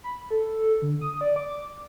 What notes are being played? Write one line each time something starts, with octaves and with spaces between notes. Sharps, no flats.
B5
A4
D3
D#6
D5
D6